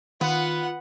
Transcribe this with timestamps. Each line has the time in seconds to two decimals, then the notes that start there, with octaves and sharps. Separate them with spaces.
0.21 D#3 B3 F4 F#5